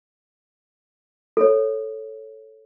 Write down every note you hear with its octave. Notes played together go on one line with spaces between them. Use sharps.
A4 C#5